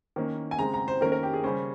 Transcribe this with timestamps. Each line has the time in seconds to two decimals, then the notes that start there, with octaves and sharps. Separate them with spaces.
0.16 D#3 A#3 C#4
0.51 G#5
0.58 C#3 G#3 C4 A#5
0.74 A#5
0.88 C5
1.01 D#3 A#3 C#4 A#4
1.12 A#4
1.23 G4
1.34 G#4
1.44 C#3 G3 C#4 C5